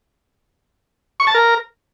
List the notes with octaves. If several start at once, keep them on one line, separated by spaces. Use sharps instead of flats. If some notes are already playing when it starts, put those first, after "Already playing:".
C#6
A5
A#4